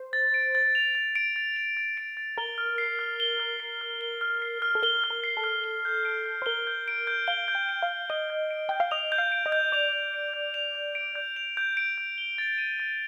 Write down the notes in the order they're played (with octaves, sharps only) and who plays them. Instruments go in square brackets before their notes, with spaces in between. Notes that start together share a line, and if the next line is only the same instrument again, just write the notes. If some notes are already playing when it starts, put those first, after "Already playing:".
Already playing: [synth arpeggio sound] C5
[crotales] A6
D7
A6
F7
A6
D7
A6
F7
A6
D7
A6
[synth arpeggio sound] A#4 [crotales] G7
[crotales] F6
C7
F6
G7
F6
C7
F6
G7
F6
C7
F6
[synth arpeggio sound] A4
[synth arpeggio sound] A#4 [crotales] G7
[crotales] F6
[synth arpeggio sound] A#4
[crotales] C7
[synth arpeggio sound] A4
[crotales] F6
G7
G6
D7
G6
[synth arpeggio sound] C5
[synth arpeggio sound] A#4 [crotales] G7
[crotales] G6
D7
G6
[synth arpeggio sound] F5 [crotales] G7
[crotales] G6
[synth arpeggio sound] G5
[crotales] D7
[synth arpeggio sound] F5
[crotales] G6
[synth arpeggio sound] D#5 [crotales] G7
[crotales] G6
D7
[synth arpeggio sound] G5 [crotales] G6
[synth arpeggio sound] F5
[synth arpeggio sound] D#5 [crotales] F7
[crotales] G6
[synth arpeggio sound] F5
[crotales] D7
[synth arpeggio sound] D#5
[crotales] G6
[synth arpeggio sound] D5 [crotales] F7
[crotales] G6
D7
G6
F7
G6
D7
G6
F7
G6
D7
G6
G7
A6
D#7
A6